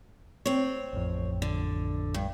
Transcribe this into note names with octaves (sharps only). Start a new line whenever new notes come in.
C4 C#5
A1 F2
D3
G2